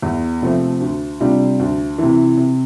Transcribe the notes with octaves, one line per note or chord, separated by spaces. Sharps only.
E2
C3 F3 A3 C4
D2
C3 G3 D4 F4
D2
C3 E3
C3